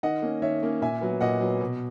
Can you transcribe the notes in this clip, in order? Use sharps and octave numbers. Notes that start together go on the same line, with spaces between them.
D#3 D#5 F#5
A#3 C#4
D#3 C#5 E5
A#3 C#4
A#2 E5 G#5
F#3 B3
A#2 D#5 F#5
F#3 B3
B2